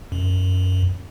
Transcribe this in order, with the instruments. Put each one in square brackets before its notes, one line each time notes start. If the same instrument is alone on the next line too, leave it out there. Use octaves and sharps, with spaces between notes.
[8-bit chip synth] F#2